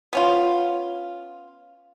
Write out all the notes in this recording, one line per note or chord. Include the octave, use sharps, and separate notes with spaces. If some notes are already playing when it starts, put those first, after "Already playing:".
B3 C#4 F4